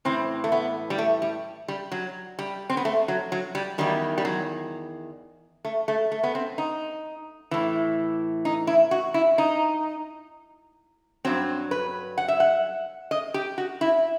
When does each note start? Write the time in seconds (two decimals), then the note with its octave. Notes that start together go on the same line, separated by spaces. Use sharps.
0.05 A2 E3 C4
0.44 A3
0.52 B3
0.90 G3
0.98 A3
1.22 G3
1.68 G3
1.92 F#3
2.39 G3
2.70 C4
2.77 B3
2.85 A3
3.08 F#3
3.32 F#3
3.55 G3
3.78 E2 D#3 F#3 G3
4.18 G3
4.25 F#3
5.65 A3
5.88 A3
6.12 A3
6.24 B3
6.35 C4
6.58 D#4
7.51 A2 E3
8.45 D#4
8.67 E4
8.91 F#4
9.14 E4
9.38 D#4
11.25 G2 F#3 C4
11.71 B4
12.18 F#5
12.28 E5
12.40 F#5
13.11 D#5
13.34 G4
13.58 F#4
13.81 E4